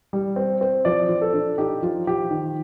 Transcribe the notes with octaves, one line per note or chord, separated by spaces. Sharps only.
G3
C4
C4
F3 D5
F3
A4
D4
D#4 G4
F3 F4
F3 G4
D#3